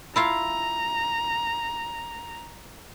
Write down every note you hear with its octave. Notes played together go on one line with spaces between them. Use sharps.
E4 F4 F5 A#5